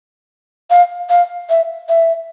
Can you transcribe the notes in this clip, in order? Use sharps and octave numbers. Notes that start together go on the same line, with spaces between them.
F5
F5
E5
E5